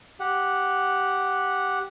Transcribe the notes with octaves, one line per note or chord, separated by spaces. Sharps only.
G4 F#5